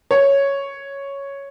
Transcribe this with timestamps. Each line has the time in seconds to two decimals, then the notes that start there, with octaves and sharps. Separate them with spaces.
0.11 C#5